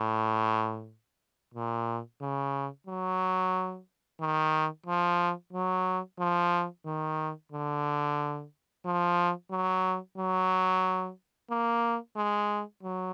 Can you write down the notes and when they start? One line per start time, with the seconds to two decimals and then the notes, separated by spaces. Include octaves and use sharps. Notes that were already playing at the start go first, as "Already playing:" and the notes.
Already playing: A2
1.54 A#2
2.21 C#3
2.87 F#3
4.21 D#3
4.86 F3
5.53 F#3
6.19 F3
6.85 D#3
7.52 D3
8.85 F3
9.51 F#3
10.18 F#3
11.51 A#3
12.16 G#3
12.83 F#3